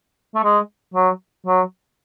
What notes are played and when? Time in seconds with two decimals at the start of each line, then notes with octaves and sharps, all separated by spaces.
0.35 A3
0.44 G#3
0.94 F#3
1.46 F#3